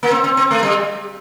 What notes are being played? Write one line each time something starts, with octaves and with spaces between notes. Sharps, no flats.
A#3
C4
C4
C4
A3
G3